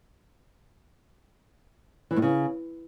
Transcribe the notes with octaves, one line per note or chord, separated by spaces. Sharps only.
E3
A2
C#3